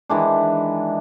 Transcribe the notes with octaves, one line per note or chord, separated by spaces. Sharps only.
D#3 E3 G#3 D4